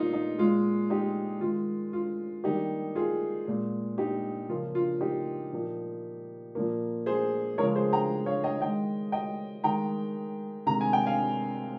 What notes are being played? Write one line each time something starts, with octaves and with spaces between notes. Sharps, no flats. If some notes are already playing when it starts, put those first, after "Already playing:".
Already playing: A#2 G3 A#3 D#4 F4
D#4
A#2 G#3 F4
D#4 G4
D#3 G#3 F4
F4
D#3 G3 A#3 D#4 G4
F4 G#4
A#2 G#3
D#4 G4
C#3 F3 A#3 F4
F4
D#4 G4
A#2 F3 A#3
A#2 F3 A#3
G#4 C5
C#3 F3 G#3 A#4 C#5
G#4 C5
G5 A#5
C#5 F5
D#5 G5
D#3 G#3 D#5 G5
D#5 G5
D#3 G#3 G5 A#5
C3 D#3 G#3 A#5
G#5
G5
F5 G#5